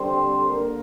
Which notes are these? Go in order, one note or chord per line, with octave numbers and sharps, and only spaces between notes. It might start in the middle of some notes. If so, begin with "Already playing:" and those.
Already playing: D3 G3 C4 C5
D3 A#3 A#4